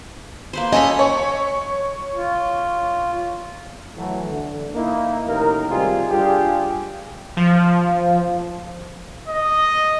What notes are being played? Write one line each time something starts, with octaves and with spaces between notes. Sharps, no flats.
A#3 B4 C5
C#4 A4 D#5 B5
C#5
F4
E3 F#3 A3
D3
A#3 D#4 E4
A1 D#3 D#4 A#4
C3 D#3 G3 G#3 F4 G#4
G3 D4 F4 G4 G#4
F3
D#5